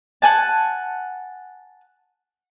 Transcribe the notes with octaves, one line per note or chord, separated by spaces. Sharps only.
F#5 G#5 A5